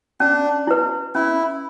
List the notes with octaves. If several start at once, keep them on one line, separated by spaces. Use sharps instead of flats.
C#4 D4
E4 B4
C#4 E4